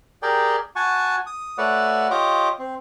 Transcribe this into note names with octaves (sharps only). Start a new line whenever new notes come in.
G4 G#4 A#4 D5 G5
F#4 F#5 G#5 A5 C#6
D#6
A3 F#4 B4 C#5 D5 F#5
F4 G4 C#5 D#5 D6
C4